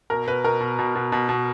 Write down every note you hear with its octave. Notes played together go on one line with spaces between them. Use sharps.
B2 A#4
B2 B4
B2 A#4
B2
B2
B2
B2
B2